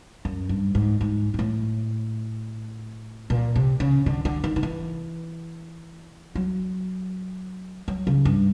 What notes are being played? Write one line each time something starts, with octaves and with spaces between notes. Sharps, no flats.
F#2
G2
G#2
G#2
G#2
A2
A#2
C3
C#3
D3
D3
D#3
D#3
E3
F#3
F#3
C#3
G2